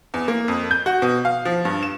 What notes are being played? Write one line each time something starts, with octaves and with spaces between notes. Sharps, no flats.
E2
A#3
F2
G6
F#4
B2
F5
F3
G2
E7